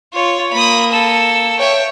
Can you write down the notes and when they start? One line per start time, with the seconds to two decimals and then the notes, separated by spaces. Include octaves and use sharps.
0.14 F4 C#5
0.53 A#3 B5 D#6
0.92 A4 E6
1.59 C#5 E5 G5